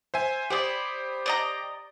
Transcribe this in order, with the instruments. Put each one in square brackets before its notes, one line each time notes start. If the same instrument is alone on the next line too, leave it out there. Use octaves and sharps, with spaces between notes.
[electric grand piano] C5 E5 G#5
[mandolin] E4 D5 [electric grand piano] G4 C5 D#6
[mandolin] D5 D#5 A#5